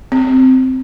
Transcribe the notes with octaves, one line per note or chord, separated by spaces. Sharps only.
C4